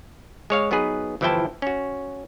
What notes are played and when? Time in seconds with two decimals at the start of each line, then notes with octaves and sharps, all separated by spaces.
0.50 G#3 C#5 F5
0.71 F#3 B3 D#4 G#4 B4
1.21 G1 E3 F3 E4 G5 A5
1.62 C#4 F#4